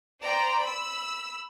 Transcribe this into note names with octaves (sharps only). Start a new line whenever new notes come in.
C5 D5 G5 A#5
B5 E6